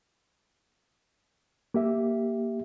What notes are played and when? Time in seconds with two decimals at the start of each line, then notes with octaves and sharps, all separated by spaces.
1.74 A#3 G4 E5